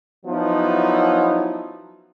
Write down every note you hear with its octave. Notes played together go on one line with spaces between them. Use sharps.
F3 F#3 B3 C#4 D#4 E4